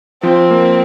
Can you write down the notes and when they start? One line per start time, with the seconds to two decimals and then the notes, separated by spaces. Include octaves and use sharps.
0.23 F3 C4
0.51 A#3